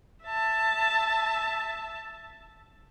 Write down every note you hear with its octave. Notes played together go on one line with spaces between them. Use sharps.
E5 A5